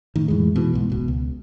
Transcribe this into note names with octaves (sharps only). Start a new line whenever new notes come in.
A2 D#3
F2 A2 E3 G#3
B2 E3
B1 G#2
D1 B2
C#2